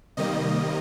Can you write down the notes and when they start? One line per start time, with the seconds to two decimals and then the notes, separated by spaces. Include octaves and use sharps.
0.17 C3 D#3 G3 A#3 D#5